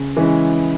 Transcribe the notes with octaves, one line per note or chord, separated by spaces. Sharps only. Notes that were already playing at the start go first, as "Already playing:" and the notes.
Already playing: C#3
E3 G#3 C#4 E4